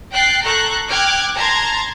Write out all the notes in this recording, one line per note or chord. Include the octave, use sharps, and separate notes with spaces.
G5 F#6 A6 C7
A4 A#5 C#6 F#6 G6
G5 D6 F6 F#6 G#6
A5 A#5 C6 G#6 A6